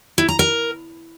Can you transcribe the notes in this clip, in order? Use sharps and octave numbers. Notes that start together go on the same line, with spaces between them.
E4
A#5
A#4